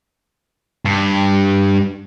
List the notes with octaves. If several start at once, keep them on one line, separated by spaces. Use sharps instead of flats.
G2